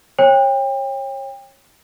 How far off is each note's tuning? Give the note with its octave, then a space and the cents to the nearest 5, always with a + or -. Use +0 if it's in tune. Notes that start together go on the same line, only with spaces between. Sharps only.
C#5 -30 G5 +30